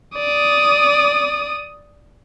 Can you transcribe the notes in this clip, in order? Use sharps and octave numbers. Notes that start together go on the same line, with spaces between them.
D5 D#6